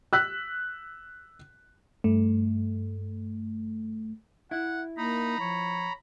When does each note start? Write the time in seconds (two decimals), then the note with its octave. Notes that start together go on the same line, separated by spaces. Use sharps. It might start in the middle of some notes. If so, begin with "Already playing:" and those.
0.13 E6 F#6 B6
2.04 G2 A3
4.51 E4 F#5
4.97 A#3 D#4 A#5 B5
5.40 F3 C#5